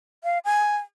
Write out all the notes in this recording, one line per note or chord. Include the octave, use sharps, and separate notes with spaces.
F5
G#5